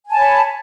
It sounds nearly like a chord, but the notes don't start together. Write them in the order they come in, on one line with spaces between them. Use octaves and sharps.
G#5 A5 C#5 B5